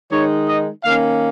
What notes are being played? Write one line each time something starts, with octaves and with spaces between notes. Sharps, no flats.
D#3 G#3 D#4 C#5
D#5
D#3 A#3 C#4 F5